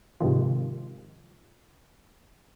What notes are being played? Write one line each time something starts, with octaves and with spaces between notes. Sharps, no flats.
G#2 C3 D#3 F3